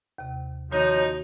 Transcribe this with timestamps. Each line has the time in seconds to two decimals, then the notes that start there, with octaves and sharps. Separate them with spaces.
0.18 D#2 C3
0.72 D#3 F3 A#3 D#4 F#4 C#5